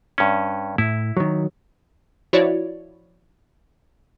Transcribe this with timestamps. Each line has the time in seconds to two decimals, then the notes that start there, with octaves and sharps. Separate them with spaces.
0.18 G2 C#4
0.78 A2 E4
1.17 D#3 F#3
2.33 F3 E4 F#4 C#5 D5